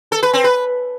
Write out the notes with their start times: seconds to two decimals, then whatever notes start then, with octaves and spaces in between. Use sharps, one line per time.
0.12 A4
0.23 B4
0.33 C4
0.44 B4